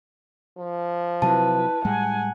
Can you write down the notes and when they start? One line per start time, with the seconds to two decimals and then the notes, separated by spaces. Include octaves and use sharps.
0.58 F3
1.22 C3 F#3 E4 B4 A5
1.85 A2 G3 G#3 F#5 G#5